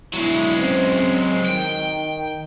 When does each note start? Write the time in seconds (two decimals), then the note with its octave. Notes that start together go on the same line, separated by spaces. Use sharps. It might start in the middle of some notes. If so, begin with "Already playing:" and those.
0.13 B2 D3 F#3 G#3 E4
0.58 C4 C#4
1.46 D#3 G5